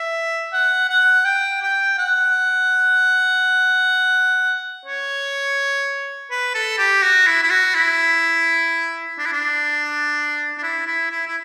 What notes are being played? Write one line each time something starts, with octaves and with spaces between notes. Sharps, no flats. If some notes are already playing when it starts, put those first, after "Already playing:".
Already playing: E5
F#5
F#5
G5
G5
F#5
C#5
B4
A4
G4
F#4
E4
E4
F#4
E4
D4
E4
D4
D4
E4
E4
E4
E4